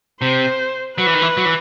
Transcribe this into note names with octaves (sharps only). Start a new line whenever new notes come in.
C3 C5
F#3 B4
E3
D#3
E3
F#3
E3